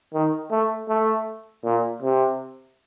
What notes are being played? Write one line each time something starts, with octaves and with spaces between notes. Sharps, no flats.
D#3
A3
A3
A#2
C3